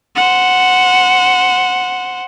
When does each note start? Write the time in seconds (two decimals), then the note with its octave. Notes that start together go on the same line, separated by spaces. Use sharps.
0.16 C5 F#5